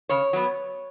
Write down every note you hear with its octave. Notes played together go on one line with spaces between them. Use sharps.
C#3 C#5
F#3 B3